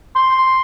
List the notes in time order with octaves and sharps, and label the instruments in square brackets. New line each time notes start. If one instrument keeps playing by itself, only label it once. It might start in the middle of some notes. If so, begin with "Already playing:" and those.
[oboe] C6